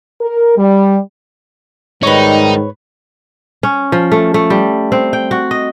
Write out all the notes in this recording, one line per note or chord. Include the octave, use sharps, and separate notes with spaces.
A#4
G3
G#2 D#3 G3 D#4 B4 C#5
C#4
F3
A3
A3
G3
C4
G5
F#4
D#5